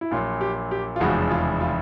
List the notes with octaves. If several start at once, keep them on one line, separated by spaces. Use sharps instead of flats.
E4
A#1 A#2 F#3 F4
G4
G4
F4
F1 E2 C#3 F3 G#3 F#4
F4
F4